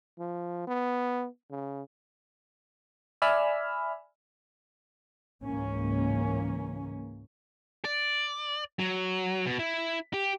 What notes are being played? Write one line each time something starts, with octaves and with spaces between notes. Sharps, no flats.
F3
B3
C#3
D5 E5 G#5 B5 E6 F6
C#2 G#2 E3 A#3 C#4
D5
F#3
B2
E4
G4